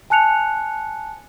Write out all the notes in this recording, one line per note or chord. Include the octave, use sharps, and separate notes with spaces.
G#5 A5 F#6 C#7 F7